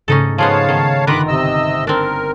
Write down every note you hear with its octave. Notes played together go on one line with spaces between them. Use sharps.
G#2 C#3 A3 C#4 D#4 A4
F3 G#3 B3 C#5 F5 A5
D#3 A3 B3
G1 D#3 D#4 F4 A#4 B5 D6 F#6
C3 D#5 E6
C4 D4 A#4